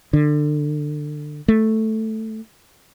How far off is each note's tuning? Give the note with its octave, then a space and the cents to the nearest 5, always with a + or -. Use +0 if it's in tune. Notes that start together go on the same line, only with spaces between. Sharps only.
D3 +25
A3 +0